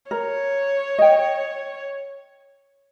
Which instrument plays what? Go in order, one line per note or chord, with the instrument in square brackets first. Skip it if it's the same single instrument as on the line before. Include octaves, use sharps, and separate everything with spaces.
[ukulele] A#4 [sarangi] C#5
[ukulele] D#5 G5